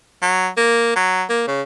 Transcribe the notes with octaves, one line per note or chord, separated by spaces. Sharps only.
F#3
A#3
F#3
A#3
C#3